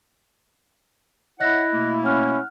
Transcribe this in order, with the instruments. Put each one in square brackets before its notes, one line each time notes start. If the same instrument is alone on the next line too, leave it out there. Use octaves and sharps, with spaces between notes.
[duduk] E4 [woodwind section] C#5 E5 F#5 [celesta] D#5 F#6 A#6
[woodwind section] B2 A3 A#3
[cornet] C#4 [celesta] F#5 F6 F#6